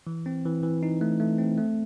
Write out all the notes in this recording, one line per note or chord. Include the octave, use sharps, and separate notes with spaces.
E3
C4
E3
E3
D#4
A3
A3
C4
A3